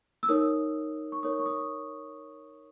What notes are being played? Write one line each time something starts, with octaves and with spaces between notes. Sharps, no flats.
E6
D#4 A#4 C#5 D#6
C#6
D#4 A#4 C#5 D#6
C#6
D#6